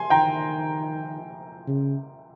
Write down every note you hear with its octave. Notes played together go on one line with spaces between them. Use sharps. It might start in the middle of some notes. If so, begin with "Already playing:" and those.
Already playing: G#5 C6
D#3 G5 A#5
C#3